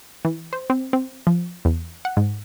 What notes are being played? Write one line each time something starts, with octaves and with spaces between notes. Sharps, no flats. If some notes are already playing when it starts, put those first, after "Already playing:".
E3
C5
C4
C4
F3
E2
F#5
G#2